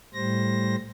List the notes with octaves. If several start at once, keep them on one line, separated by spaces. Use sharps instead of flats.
A2 G3 C5 A#6